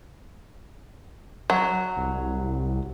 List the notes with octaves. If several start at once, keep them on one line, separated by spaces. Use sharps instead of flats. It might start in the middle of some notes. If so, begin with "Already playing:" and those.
F#3
C2